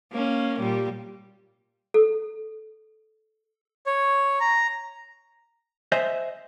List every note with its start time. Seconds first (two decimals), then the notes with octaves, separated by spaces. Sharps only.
0.12 A#3 C#4
0.59 A#2 G3
1.94 A4
3.86 C#5
4.40 A#5
5.92 C5 D#5 E5 G#5